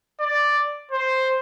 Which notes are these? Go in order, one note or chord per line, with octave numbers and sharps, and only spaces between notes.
D5
C5